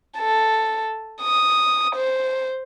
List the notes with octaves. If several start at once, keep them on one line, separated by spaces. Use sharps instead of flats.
A4
D#6
C5